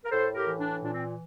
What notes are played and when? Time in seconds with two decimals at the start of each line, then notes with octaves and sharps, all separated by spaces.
0.05 A#4
0.11 A2 A4 C5
0.34 G4 A#4
0.47 E3
0.59 D4
0.83 A#2 D4
0.93 C4